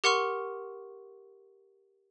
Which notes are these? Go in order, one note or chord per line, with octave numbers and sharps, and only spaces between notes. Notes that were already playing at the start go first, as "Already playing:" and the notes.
G4 A#4 F#5 C6 C#6 F6